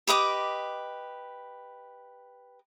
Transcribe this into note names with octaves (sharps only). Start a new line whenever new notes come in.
G4 B4 D#5 D6